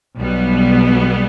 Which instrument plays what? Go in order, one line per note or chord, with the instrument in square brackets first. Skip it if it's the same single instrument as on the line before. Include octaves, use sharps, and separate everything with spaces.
[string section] B1 B2 G3 B3